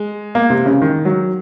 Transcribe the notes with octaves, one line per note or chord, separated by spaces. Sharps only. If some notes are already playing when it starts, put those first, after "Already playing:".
Already playing: G#3
A#3
C3
C#3
D#3
F#3